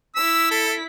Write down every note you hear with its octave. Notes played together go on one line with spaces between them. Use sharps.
E4 E6 B6
A4